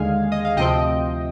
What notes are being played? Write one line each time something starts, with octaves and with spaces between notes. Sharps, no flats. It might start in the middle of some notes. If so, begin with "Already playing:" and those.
Already playing: D#2 D3 G#3 F5 G#5
D#5
F5
D2 C3 F3 C4 D#5 G5